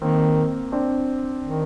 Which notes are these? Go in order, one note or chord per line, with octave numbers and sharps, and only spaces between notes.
D#3 A#3 C4
C4 D4
D#3